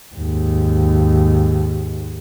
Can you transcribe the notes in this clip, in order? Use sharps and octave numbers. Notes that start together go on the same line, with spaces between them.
D#2 G#2